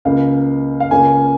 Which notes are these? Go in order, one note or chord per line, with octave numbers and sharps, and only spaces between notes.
C#2 C#3 A#3 F5
F5
C#2 C#3 A#3 C#4 G#5